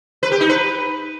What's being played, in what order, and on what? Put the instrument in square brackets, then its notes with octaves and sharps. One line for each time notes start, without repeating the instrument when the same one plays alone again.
[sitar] B4
G4
D#4
B4